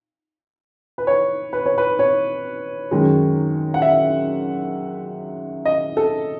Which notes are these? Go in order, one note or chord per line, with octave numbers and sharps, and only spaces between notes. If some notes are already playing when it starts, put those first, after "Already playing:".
B4
C#5
B4
C#5
B4
C#5
F#2 D#3 G#3
F#5
E5
D#5
A4